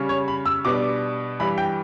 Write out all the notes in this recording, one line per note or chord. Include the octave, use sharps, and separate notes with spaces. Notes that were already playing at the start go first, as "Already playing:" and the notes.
Already playing: C#3 G3 C#4
C#5
B5
E6
B2 G3 B3 D4 D6
G2 E3 G3 B5
G5